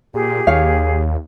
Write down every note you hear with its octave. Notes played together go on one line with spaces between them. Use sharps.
A#2 G4 G#4
D#2 C#5 F5